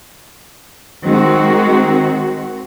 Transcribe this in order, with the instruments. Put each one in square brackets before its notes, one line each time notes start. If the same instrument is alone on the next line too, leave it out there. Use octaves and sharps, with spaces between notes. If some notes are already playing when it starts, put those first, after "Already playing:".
[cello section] D#3 G#3 C4 F#4